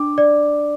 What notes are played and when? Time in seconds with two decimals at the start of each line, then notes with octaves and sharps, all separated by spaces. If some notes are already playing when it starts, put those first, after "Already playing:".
Already playing: D4 D6
0.18 D5